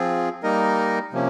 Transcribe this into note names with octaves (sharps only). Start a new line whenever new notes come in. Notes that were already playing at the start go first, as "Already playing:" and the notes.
Already playing: F3 C4 F4 G#4
G3 A#3 D#4 A#4 D#5
C3 F3 A#3 C#4